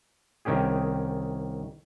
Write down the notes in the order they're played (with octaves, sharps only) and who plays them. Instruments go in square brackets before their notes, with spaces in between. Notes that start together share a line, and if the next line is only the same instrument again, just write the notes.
[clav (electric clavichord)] C2 D#3 C#4 G4 G#4